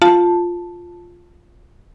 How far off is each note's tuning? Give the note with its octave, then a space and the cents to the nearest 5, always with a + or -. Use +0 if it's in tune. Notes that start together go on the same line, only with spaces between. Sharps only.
F4 +0 A5 +0